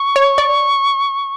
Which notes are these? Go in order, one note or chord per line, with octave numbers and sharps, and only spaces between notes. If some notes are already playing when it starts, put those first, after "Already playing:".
Already playing: C#6
C#5
D5